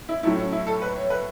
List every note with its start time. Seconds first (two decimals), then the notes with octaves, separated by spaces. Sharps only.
0.09 E4
0.23 A2 F#3 A3 E4
0.37 C#4
0.52 E4
0.67 A4
0.82 B4
0.96 C#5
1.10 B4